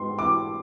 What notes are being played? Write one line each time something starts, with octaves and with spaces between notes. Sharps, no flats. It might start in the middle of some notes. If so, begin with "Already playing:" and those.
Already playing: G#2 G#3 B3 C6
E3 D6